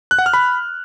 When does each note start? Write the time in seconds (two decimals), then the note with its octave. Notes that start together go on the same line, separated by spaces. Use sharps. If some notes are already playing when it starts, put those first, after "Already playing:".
0.11 F#6
0.19 F#5
0.26 F6
0.34 B5